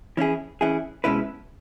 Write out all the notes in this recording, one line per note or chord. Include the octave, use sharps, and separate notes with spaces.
E3 C#4 E4 G#4
E3 C#4 E4 G#4
B2 G#3 C#4 E4 B4